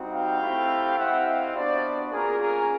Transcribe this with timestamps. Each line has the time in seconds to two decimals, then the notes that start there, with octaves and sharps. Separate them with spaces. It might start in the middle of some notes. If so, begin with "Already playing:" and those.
Already playing: G3 C4 D#4 F#4
0.12 F5 G5
0.41 A3 C4 E4 G4
0.97 C4 E4 G4 E5 F#5
1.25 D#5 F5
1.55 B3 D4 F#4 C5 D5
2.11 A#3 C#4 F4 G#4 A#4
2.39 G#4 A#4